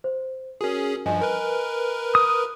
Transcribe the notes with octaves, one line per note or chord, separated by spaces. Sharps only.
C5
C#4 F#4 G#4 A#4
G2 F3 D#5 G#5
A#4 B4
D#6